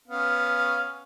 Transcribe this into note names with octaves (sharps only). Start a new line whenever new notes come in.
B3 C#4 F5